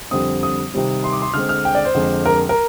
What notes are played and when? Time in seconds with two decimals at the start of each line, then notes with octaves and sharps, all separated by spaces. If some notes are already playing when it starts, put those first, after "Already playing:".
0.11 F2 D3 G3 C4 D#6
0.43 D#6
0.73 C3 D#3 G3 C4
1.04 C6
1.12 D6
1.22 C6
1.34 D3 G#3 C4 F6
1.49 F6
1.65 G5
1.75 D5
1.85 C5
1.94 F2 D3 G#3
2.26 A#4
2.49 A#4